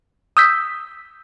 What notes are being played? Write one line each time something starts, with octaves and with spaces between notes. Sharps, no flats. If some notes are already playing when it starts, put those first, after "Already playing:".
D#6 E6 G6 B6